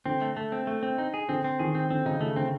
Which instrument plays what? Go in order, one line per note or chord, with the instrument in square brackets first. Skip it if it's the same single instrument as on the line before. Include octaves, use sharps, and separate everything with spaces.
[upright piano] D3 [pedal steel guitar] C4
[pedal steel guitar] A3
A3
C4
A3
C4
D#4
G#4
[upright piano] D3 [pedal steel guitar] C4
[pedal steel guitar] C4
[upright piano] D#3 [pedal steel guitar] G#4
[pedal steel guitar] C4
[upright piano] D3 [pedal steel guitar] C4
[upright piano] C#3 [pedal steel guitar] D#4
[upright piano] C#3 [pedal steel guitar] A3
[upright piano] D3 [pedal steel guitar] C4